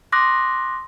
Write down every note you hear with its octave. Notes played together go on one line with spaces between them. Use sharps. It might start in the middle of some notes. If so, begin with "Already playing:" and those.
C6 D6 D#6 F#6 A#6